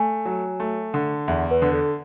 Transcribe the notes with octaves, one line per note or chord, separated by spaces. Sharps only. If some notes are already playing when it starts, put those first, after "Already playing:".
Already playing: A3 G#5
F#3
A3
D3
E2 E5
B4
D3
A4